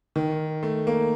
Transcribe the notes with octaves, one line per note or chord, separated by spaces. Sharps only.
D#3
A3
A#3